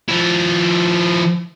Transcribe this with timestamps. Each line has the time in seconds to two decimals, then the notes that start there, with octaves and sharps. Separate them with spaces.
0.09 F3 E4